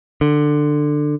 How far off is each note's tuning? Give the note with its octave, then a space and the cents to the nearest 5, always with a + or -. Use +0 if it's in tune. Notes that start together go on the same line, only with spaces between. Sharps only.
D3 +15